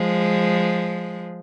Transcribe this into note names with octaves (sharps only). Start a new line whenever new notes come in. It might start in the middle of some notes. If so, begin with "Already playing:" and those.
Already playing: F3 G#3